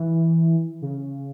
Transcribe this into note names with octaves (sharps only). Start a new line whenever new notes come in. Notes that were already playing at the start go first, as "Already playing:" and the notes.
Already playing: E3
C#3